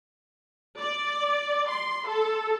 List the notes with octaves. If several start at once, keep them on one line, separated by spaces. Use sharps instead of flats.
D5
C6
A4